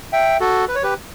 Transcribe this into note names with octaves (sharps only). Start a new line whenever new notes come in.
E5 G5
F#4 A4
B4
C#5
G4 B4